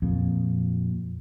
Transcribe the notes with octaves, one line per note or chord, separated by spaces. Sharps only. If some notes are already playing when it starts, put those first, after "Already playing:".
F2 A#2